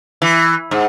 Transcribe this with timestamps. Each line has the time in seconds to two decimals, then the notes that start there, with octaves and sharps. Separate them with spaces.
0.22 E3
0.71 G#2